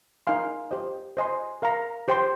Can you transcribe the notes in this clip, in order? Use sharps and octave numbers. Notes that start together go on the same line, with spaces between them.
D#4 A#4 F5 G#5 C6
G4 C5 D#5
C5 D#5 G#5 C6
A#4 F5 A#5
G4 C5 G5 C6